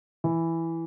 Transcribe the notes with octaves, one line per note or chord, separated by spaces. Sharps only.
E3